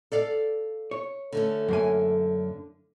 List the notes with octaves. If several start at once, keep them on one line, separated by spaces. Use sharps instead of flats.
A4 D5 F5
C#5
D3 A3 C#4 A4
F#2 A#3 G#5